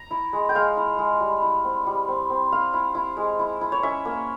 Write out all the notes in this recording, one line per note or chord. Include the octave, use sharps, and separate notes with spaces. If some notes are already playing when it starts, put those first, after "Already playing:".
Already playing: A#5
E4
G#3
G5
G#3 F5
E4
G#3
G3
E4
C4
G3
C4
C4
E4 F5
E4
E4
G#3
E4
E4
C#5
C#4 E5
A#3